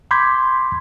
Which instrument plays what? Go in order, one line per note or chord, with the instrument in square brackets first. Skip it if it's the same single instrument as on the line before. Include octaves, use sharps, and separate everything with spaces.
[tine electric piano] B5 C6 D6 G6 G#6 B6